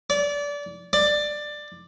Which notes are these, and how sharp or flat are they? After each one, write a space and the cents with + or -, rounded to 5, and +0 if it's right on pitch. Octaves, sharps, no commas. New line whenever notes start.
D5 -25
D5 +15